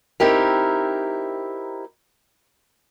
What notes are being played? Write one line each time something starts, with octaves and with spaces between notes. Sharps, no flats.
C4 D#4 E4 G4 A#4